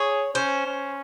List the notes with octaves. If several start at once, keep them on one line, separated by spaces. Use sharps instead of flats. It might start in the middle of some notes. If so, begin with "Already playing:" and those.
Already playing: G#4 C#5
C#4 C5
C#4